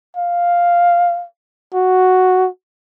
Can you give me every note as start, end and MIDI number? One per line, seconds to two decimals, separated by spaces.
0.17 1.25 77
1.74 2.48 66